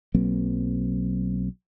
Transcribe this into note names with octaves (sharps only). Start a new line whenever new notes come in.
B1 F#3 A#3 C4